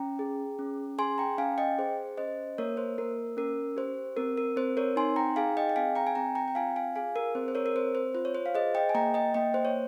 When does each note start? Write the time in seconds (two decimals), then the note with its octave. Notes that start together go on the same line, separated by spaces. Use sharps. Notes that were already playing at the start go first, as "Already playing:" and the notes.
Already playing: C#4 G5 A#5
0.19 G#4
0.59 C#4
0.98 G#4 G#5 C6
1.18 G5 A#5
1.38 C#4 F5 G#5
1.58 D#5 G5
1.78 G#4 C5
2.17 C#4 C5 D#5
2.58 A#3 A#4 C#5
2.77 C5
2.98 A#3 A#4
3.37 C#4 A#4
3.77 G4 C5
4.17 C4 A#4
4.37 A#4
4.56 C4 C5
4.77 A#4 C#5
4.96 D#4 G#5 C6
5.16 G5 A#5
5.36 G#4 F5 G#5
5.57 D#5 G5
5.69 G5
5.76 C4 F5 G#5
5.95 G5 A#5
6.07 G#5
6.15 C4 G5 A#5
6.35 G5 A#5
6.48 G5
6.55 F4 F5 G#5
6.76 F5 G#5
6.96 G#4 F5 G#5
7.16 A#4
7.35 C4 C5
7.48 C5
7.55 A#4 C#5
7.66 A#4
7.75 C4 C5
7.95 C5
8.14 F4 C5
8.25 C#5
8.35 C5
8.46 F5
8.55 G#4 C5 D#5
8.75 D#5 G5
8.89 G#5
8.95 A#3 G5 A#5
9.14 D#5 G5
9.34 A#3 D#5 G5
9.54 C5
9.65 C#5